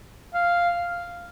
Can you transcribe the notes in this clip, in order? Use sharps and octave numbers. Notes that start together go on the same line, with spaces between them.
F5